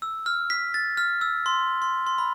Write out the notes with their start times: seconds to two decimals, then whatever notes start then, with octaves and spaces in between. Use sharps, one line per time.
0.02 E6
0.26 F6
0.50 B6
0.74 A6
0.97 F6
1.21 E6
1.46 C6
1.82 C6
2.07 C6
2.18 B5